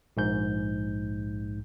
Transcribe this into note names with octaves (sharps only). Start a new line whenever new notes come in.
A#1 G#2 G6